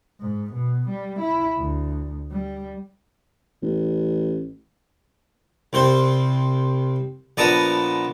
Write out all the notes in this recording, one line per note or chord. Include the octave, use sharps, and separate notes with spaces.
G#2
B2
G3
E4
D2
G3
A1
C2 C4 C5
A#1 B3 D5 A5 A#5 D#6